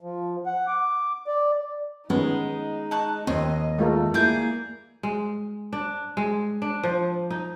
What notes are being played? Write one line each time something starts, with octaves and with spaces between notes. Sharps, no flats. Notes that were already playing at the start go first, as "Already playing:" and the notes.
F3
F#5
D6
D5
D#3 G#3 B3 C#4 D#4
A5 C#6 F#6
D#2 C4 D#5
G#3 A3 F4 A#4
A#3 E4 G#4 D5 G6
G#3
D4
G#3
D4
F3
D#4